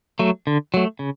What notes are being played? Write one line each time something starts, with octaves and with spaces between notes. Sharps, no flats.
F#3 A3
D3
F#3 A3
C#3